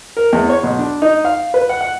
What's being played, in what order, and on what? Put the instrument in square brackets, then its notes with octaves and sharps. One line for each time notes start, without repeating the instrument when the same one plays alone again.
[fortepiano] A#4
E2
C#5
B1
D4
D#4
F5
B4
F#5
F#5